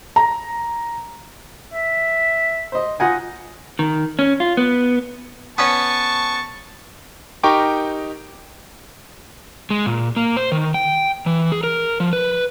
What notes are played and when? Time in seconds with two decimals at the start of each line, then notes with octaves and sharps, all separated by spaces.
0.16 A#5
1.73 E5
2.72 C5 D#5
3.00 D#4 F4 F#5 G#5
3.79 D#3
4.19 C#4
4.40 F4
4.57 B3
5.58 B3 C#4 B4 A5 C#6
7.43 D#4 G4 A#4 G5 C#6 D6
9.70 G#3
9.86 A#2
10.16 A#3
10.37 C5
10.52 D#3
10.74 G5
11.26 E3
11.52 G#4
11.64 A#4
12.00 F3
12.13 B4